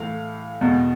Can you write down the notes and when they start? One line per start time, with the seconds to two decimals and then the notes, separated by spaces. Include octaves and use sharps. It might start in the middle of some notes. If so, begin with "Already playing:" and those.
Already playing: A2 E3 F5
0.61 E2 B2